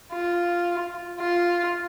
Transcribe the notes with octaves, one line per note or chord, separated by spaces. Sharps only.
F4
F4